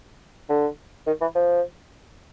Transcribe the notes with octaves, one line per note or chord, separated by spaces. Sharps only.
D3
D#3
E3
F3